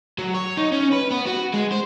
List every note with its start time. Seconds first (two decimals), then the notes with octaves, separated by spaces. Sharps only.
0.19 F#3
0.34 C#5
0.57 D#4
0.72 C#4
0.92 B4
1.10 B3
1.26 F#4
1.53 G#3
1.72 C5